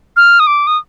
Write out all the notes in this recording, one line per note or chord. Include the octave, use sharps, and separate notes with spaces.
F6
D#6
D6
D#6